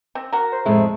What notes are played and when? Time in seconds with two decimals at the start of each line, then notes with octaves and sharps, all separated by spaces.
0.15 C4
0.32 F#4 A#4
0.52 C5
0.66 F2 A2 G#3 A3